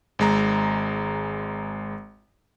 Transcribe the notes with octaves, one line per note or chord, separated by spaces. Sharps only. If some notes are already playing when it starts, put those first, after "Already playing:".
G#1 G#3 A#5